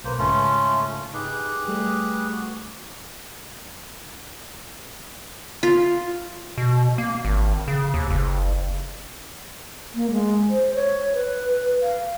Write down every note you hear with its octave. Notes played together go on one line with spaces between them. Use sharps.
B1 A#3 B4 C5
G#2 C#3 A3 C#4 F4
D#4 G4 G#4 B4
G3 A3
F#4
F4
B2
A#3
G#1
C#3
D#2
F#1
A#3
G#3
C5
C#5
B4
F5